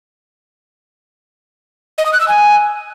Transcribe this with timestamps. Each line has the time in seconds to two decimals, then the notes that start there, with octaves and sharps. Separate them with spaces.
1.98 D#5
2.06 D#6
2.13 F#6
2.21 E6
2.28 G#5